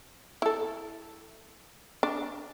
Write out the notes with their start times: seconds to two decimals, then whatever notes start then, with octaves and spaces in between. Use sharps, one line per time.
0.42 E4 A4
2.03 D4